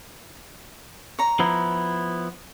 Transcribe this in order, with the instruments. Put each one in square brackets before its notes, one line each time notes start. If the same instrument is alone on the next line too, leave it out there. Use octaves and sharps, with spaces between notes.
[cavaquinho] C#5 A#5
[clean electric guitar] F3 B3 E4